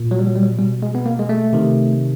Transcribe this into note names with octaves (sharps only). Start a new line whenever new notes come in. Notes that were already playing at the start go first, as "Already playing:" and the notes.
Already playing: A#2
F#3
G3
F#3
G3
F#3
B2 G3
G#3
B3
A#3
G#3
A3
C3 D#3